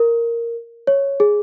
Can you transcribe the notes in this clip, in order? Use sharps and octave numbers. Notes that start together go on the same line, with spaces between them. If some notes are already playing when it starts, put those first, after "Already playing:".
Already playing: A#4
C#5
G#4